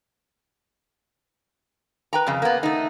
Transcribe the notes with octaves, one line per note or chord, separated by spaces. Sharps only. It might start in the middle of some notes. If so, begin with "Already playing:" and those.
B4 G5 A#5
F2 C#3
A#3 B3
A3 D#4